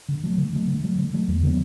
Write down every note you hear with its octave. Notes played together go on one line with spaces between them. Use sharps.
D3
F#3 A3
D3
F#3 A3
D3
F#3 A3
D3
F#3 A3
E2
D3 F#3 B3